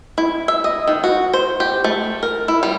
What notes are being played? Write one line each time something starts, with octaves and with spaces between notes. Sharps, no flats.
E4
E5
D#5
D#3
F#4
C5
G4
A3
A#4
E4
G3